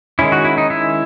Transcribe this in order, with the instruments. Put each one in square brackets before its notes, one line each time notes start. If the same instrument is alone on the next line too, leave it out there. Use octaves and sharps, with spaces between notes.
[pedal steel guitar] D#3 G#3 C#4 E4
F#4
E4
D#4
E4